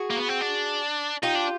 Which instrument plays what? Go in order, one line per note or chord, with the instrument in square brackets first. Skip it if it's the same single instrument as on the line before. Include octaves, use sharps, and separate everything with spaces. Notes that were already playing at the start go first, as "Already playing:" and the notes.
Already playing: [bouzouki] F#4 G#4
[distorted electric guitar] A#3
B3
C4
D4
[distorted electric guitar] D#4 [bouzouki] F4 G4
[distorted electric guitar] D4